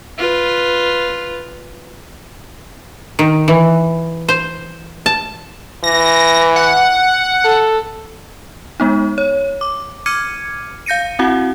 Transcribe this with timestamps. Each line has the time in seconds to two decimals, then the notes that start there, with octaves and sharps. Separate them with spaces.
0.18 F4 B4
3.19 D#3
3.48 E3
4.28 C5
5.06 A5
5.84 E3 A#6
6.56 F#5
7.45 A4
8.80 G#3 B3 D#4
9.18 C#5
9.61 D6
10.06 D6 F6 G#6 C#7 D#7
10.86 F5 G6 A#6 C#7 D#7
11.19 C4 E4 F#4 F5 F#5